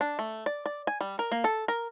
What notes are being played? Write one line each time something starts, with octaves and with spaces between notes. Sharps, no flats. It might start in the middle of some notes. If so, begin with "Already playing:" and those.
D4
A3
D5
D5
G#5
G3
A#4
A#3
A4
A#4